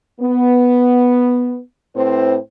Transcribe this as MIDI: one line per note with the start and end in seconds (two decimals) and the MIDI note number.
0.21 1.59 59
1.95 2.37 45
1.95 2.37 60
1.95 2.37 64
1.95 2.37 71
1.95 2.37 72